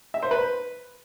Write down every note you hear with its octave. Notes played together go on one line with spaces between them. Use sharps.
E5
C5
B4